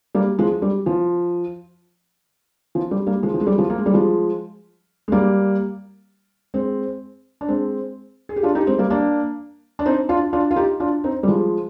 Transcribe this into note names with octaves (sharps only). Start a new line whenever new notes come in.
G3 A#3
F3 G#3
G3
F3
F3
G3
G3 A#3
F3 G#3
F3
G#3
G3
F3 G#3
A#3
G#3
G3
F3 G#3
G#3
G3 A#3
G#3 C4
D4
G#3 C4
G#4
G4
D4 F4
D#4 G4
G#3 C4
G3 A#3
A#3 D4
D4
C4 D#4
D4 F4
D4 F4
F4
D#4 G4
D4 F4
C4 D#4
G3
F3 G#3